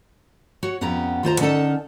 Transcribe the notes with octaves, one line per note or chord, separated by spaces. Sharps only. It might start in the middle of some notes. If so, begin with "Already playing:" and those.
F#4 C#5
F2 B3 C#4 G4 A#5
D#2 F4 C5 A#5
D3 C#4 D#4 A4 A#4 A5